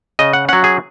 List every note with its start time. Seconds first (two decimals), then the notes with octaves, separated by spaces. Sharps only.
0.19 C#3 D#5
0.33 F#5
0.48 F#3 C#4 F#5
0.64 G#4